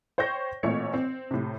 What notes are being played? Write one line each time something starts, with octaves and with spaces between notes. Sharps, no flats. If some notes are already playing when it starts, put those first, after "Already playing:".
C5 C#5 G5 C#6 G6 A#6
A1 A#2 A3 C4 C#5 C#7
C4
A2 C3